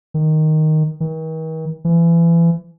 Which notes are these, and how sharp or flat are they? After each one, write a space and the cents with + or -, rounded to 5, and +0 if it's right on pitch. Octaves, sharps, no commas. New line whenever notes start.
D#3 +0
D#3 +45
E3 +30